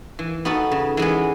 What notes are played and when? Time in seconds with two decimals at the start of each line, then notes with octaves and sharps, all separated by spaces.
0.19 E3
0.45 B3 D#4 F#4 A4
0.71 C#3
0.97 E3 G#3 B3